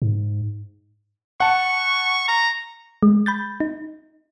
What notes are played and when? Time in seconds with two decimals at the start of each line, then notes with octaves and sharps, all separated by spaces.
0.02 G#2
1.40 F#5 A5 C#6
2.28 A#5
3.03 G#3
3.26 B5 G6 A6
3.60 D#4